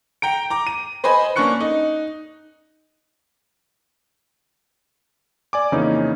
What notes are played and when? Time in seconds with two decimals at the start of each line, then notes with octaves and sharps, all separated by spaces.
0.22 G5 A#5 D7
0.50 A#5 D6
0.67 D#7
1.04 B4 C5 D#5 G#5 B5
1.36 A#3 C#4 D4 C#6 F#6 C#7
1.60 D#4
5.53 D5 G#5 D6
5.72 F2 C#3 E3 A#3 C#4 D#4